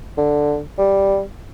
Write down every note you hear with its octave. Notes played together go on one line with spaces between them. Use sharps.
D3
G3